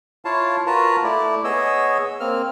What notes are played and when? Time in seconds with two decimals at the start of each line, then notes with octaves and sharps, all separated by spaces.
0.25 E4 F4 C#5 F5 A5
0.66 F4 F#4 A#4 B4 A5 A#5
1.04 A3 E4 D5
1.44 B3 G#4 C#5 D#5 E6
2.20 A#3 C4 F6